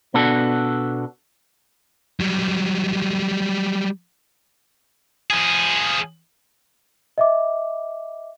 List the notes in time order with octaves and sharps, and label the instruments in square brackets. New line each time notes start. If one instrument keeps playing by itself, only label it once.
[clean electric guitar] B2 B3 D4 F#4 A4
[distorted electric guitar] F#3 G3
F3 G#4
[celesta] D#5 E5 D6